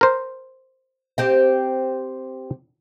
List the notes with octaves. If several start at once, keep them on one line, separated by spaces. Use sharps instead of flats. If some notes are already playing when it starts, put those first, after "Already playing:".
A#4 C5
C4 G4 D#5